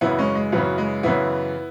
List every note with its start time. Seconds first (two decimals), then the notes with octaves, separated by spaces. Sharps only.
0.01 F#2 C#3 E3 B3 E4
0.18 G#3 C#4
0.35 G#3
0.52 F#2 C#3 E3 F#3 B3
0.78 G#3
1.03 F#2 C#3 E3 B3 E4